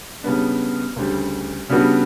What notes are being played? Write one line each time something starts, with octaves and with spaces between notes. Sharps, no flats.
C#3 G3 B3 D4
D2 C#3 G3
C#3 G3 B3 D4 F#4